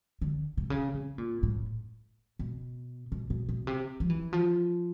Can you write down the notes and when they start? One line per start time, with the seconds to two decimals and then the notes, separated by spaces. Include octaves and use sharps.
0.21 D3
0.57 C3
0.70 C#3
0.94 C3
1.18 A#2
1.43 A2
2.39 B2
3.12 B2
3.30 B2
3.49 B2
3.67 C3
4.00 F3
4.10 E3
4.33 F3